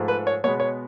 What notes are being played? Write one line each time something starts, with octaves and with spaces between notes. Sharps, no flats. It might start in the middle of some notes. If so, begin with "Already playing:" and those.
Already playing: G#2 F3 A3
B4
C#5
B2 G#3 B3 C#5
C#5